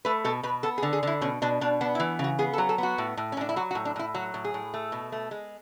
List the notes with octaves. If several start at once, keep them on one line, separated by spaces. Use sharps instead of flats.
A3 B4
B2 A4
B2 B4
B3 A4
G#4
D3
G#4
D3 E4
B2 C#4
B2 D4
B2 D4
B3 D4
E4
E3
C#3 F#4
B3 G#4
A4
F#3
A4
B3 F#4
A2
A2
C#4
A2 D4
E4
F#3 F#4
F#4
A2
D4
A2 E4
F#3 F#4
A2
G#4
A2
A3
B2
A3
G#3